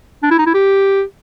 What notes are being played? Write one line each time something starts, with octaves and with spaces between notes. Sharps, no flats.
D4
E4
D#4
E4
G4